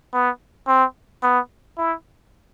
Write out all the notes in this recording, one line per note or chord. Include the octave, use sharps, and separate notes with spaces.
B3
C4
B3
E4